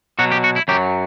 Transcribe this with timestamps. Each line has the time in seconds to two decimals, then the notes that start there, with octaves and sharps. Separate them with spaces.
0.19 B2 F#3 F#4
0.32 G4
0.44 F#4
0.56 E4
0.68 F#2 F#3 G4